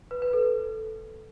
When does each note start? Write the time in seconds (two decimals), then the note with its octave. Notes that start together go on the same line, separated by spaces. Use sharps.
0.11 B4
0.22 B4
0.33 A4